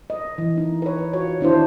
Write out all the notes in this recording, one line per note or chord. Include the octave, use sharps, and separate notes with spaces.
D#5
E3
D#4
B4 C#5
F4 F#4 C#5
D#3 D4 E4 C5